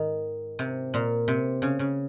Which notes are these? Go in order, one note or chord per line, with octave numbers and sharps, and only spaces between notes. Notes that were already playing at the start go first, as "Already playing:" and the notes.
Already playing: G#2 D#3
C3
A#2
C3
C#3
C#3